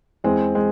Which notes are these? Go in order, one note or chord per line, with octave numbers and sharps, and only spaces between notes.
E2 E3 G#3 C4
G#3